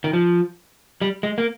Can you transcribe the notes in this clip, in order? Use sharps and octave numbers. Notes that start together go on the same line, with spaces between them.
D#3
F3
G3
G#3
A#3